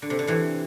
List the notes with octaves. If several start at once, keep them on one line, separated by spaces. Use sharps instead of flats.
D3
C3
D3
C3 E3